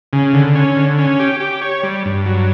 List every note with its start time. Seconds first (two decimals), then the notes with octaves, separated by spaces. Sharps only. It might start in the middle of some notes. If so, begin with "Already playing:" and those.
0.13 C#3
0.34 D3
0.55 C#4
0.76 D3
0.98 C#4
1.20 G4
1.40 G4
1.62 C#5
1.83 G3
2.05 G2
2.26 F#3